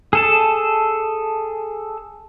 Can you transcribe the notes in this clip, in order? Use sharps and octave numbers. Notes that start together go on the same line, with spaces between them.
G#4 A4 A5